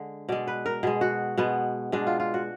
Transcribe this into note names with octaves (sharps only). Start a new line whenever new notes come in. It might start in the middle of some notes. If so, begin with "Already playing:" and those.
Already playing: D3 G#3
B2 G#3 D5
B4
A#4
B2 G#3 G#4
F#4
B2 G#3 B3
B2 G#3 D4
F4
F4
F#4